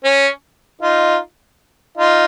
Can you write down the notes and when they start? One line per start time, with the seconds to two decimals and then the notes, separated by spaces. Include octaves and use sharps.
0.04 C#4
0.81 D#4 F4
1.97 D#4 F4